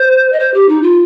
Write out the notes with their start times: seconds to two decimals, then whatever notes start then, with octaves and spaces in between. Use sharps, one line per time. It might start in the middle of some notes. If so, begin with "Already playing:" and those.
Already playing: C5
0.32 D#5
0.39 C5
0.54 G4
0.69 D#4
0.82 F4